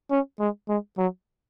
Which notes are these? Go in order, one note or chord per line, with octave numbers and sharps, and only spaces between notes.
C#4
G#3
G#3
F#3